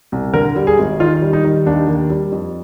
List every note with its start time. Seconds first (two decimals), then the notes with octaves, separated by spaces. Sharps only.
0.12 C2
0.34 D3 A#4
0.56 G3
0.67 G#4
0.79 G#1
1.00 D#3 F4
1.22 G3
1.33 D#4
1.44 D#3
1.66 D#2 D4
1.88 D#2
2.10 G3
2.32 F2